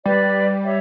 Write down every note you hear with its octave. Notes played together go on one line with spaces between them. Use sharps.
G3 B4 D5
C#5 E5